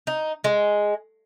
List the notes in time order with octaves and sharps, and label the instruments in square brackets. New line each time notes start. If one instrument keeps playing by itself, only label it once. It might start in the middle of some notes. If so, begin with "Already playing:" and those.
[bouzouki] D#4
G#3